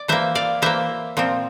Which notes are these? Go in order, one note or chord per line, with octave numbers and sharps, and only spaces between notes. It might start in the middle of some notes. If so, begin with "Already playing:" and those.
Already playing: D5
E3 A#3 C5 E5
D5 F5
E3 A#3 C5 E5
A#2 F3 C4